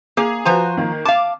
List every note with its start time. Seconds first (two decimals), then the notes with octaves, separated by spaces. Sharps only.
0.17 A#3 G#4 F7
0.45 F3 F#4 B4 C5 G#5 A#5
0.77 D#3 A#3
1.05 F5 A5 D6